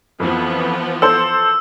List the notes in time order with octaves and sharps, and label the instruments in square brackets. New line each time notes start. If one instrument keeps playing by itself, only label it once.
[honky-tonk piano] F2 [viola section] E3 F3 B3
[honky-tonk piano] A4 C5 C6 [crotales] E6